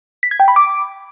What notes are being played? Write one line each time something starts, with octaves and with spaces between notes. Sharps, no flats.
B6
G#6
G5
B5
D6